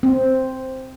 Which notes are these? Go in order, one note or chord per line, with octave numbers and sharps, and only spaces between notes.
C4